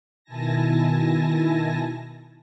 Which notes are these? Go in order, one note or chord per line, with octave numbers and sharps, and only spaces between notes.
B2 D#3 E4 G#5 A5 A#6